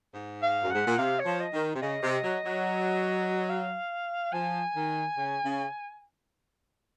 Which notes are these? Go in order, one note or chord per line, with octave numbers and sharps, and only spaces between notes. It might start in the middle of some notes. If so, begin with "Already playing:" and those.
G#2
F5
F#2
G#2 F#5
A#2
C3 F5
C#5
F3
D#5
D#3
C3
C#3 D#5
C3
F#3
F#3
F5
F3 G#5
D#3
C#3
C#3